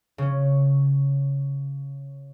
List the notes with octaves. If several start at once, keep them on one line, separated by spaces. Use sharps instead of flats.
C#3 C#4